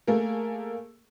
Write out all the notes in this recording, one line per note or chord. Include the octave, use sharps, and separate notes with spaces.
A3 A#3 G#4 A#4